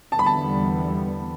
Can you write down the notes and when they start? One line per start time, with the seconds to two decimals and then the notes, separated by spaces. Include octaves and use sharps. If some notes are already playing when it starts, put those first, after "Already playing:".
0.12 E2 D3 G3 B3 A5
0.19 B5
0.26 A5